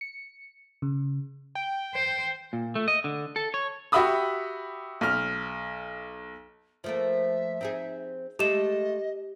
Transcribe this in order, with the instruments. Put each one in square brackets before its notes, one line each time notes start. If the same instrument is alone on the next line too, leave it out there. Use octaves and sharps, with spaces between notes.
[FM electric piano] C#7
C#3
[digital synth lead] G5
[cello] C5
[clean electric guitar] A#2
A3
D#5
D3
A4
C#5
[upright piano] F#4 G4 E5 B5 D#6 E6
B1 F6
[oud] F3 A3 A#3 [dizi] E5
[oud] C4 D#4 G#4
[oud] G#3 A3 [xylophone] G4 E7 [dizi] D#5